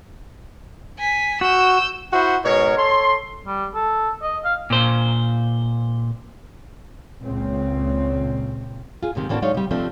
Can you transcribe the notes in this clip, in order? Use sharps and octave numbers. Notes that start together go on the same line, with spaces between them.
G#5 B6
F#4 E6 G6
E4 F#4 C5 E5 F#5
G#2 B2 A#4 C#5
A4 C#5 C6
G3
A4
D#5
F5
A#2 C5
C#2 A#2 C#3 C4
F4 G#4
D#2 G#2 C3 D#3
A2 A#3 C4 D4 F#4 A5
F#3 G#3 D#4 C#5 D5 F5
C3 G3
C3 F3 A3 C4 D4